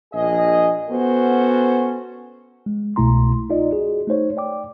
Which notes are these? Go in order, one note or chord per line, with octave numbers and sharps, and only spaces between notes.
A#1 G#4 D#5
B3 C#4 F#4 A4 C5
G#3
C2 B2 A3 E4 A#5 C6
D#4 F4 D5 D#5
F#4 G#4
A3 D#4 C5 C#5
D5 G5 D6